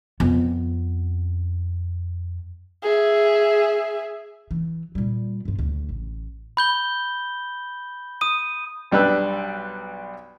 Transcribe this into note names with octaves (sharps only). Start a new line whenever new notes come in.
F2 B3
G#4 E5
E3
A#2 G3
G2 F4
D2
A1
B5 G6 G7
D#6 D#7
B1 G3 D4 B4 E6